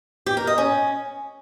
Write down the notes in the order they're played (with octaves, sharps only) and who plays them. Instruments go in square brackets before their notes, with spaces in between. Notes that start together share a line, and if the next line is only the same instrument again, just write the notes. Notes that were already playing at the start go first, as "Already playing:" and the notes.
[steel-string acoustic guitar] G4
A#4
D#5
C#4